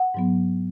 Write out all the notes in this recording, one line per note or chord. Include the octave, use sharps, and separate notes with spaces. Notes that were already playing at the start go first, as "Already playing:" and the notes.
Already playing: F#5
G#2 F#3 B3